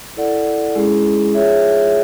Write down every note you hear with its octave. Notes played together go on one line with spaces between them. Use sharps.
E4 A4 D5 F#5
G#3 C#4 E4 G#4
F4 G#4 C#5 E5